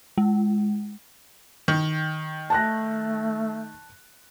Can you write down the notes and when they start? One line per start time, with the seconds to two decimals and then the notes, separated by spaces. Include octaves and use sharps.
0.18 G#3
1.68 D#3
2.50 A3 A5 F#6 A#6